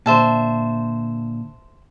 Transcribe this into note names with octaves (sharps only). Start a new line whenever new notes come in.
A#2 D3 C5 E5 A5